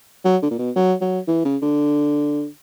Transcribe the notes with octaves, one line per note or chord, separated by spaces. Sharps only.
F#3
D3
A#2
B2
F#3
F#3
E3
C#3
D3